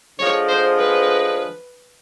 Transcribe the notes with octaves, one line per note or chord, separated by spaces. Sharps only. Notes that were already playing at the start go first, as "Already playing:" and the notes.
D3 F3 G#3 C#5
C5
B4